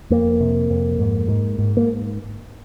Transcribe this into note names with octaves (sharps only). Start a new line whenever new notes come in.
F2 A#3
C3
F2
G#2
G#2
G#2
A#3